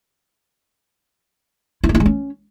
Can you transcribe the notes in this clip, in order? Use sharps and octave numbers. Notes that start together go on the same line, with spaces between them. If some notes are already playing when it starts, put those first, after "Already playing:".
E4
A3
E4
G#3
C#4